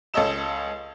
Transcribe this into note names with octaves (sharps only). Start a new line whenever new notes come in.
C#2 A4 C#5 D#5 E6 E7